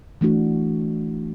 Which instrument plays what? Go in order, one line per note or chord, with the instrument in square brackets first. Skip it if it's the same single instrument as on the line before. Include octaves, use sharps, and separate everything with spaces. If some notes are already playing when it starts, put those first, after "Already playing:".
[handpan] E3 A3 D4 F#4